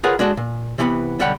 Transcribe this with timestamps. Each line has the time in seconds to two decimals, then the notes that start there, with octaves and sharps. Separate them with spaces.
0.04 F4 G#4 A#4 B4 C#5 F#5
0.19 G#3 D4 F#4 G#4 A4
0.37 A#2
0.78 C3 E3 B3 G5 B5
1.19 B1 D3 G3 F#5 G5 B5